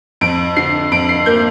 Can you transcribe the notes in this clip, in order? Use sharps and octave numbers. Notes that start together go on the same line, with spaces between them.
F2 D7
D3 C7
F2 D7
C7
A#3 G6